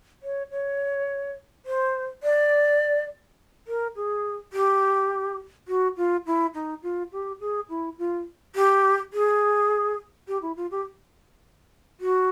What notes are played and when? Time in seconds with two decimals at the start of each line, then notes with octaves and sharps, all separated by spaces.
0.23 C#5
0.51 C#5
1.66 C5
2.23 D5
3.67 A#4
3.96 G#4
4.53 G4
5.68 F#4
5.97 F4
6.26 E4
6.54 D#4
6.83 F4
7.12 G4
7.40 G#4
7.69 E4
7.98 F4
8.55 G4
9.13 G#4
10.28 G4
10.42 E4
10.57 F4
10.71 G4
12.00 F#4